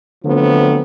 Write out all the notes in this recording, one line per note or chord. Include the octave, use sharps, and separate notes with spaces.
D3 F3 F#3 A3 B3 C4